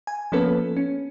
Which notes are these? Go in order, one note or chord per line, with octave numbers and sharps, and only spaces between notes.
G#5
F3 A#3 B3 C#4 A4 B4
C#4